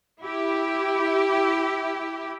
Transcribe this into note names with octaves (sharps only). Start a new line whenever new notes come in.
E4 G4